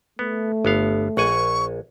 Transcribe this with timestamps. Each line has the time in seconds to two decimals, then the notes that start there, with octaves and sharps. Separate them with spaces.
0.19 A3 B3
0.65 G1 B3 F5
1.17 A#1 F#5 G#5 C#6